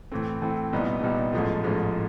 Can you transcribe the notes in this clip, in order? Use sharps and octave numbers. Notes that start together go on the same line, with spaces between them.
A2 E3 A3 C4
A2 E3 A3 C4
C2 A#2 G3 B3 D#4
C2 A#2 G3 B3 D#4
A1 G#2 F3 A3
A1 G#2 F3 A3